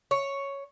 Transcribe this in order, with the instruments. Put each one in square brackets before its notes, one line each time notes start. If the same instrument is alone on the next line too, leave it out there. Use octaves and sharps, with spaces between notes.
[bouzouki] C#5